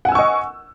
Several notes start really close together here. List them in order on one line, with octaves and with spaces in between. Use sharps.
F#5 G#5 E6 C#6 D#5